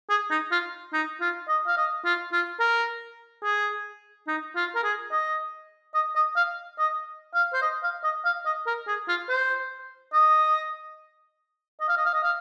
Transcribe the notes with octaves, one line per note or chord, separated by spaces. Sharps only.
G#4
D#4
F4
D#4
F4
D#5
F5
D#5
F4
F4
A#4
G#4
D#4
F4
A#4
G#4
D#5
D#5
D#5
F5
D#5
F5
C5
D#5
F5
D#5
F5
D#5
A#4
G#4
F4
C5
D#5
D#5
F5
D#5
F5
D#5
F5